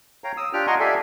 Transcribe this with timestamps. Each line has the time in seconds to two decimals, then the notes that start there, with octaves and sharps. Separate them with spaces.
0.24 C#5 F5 G5 A#5
0.37 D#6 E6
0.53 D4 F4 G4 G5 F6
0.67 D#5 F#5 G#5 A#5 C6 C#6
0.80 G4 A4 D5 E5 F5 G#5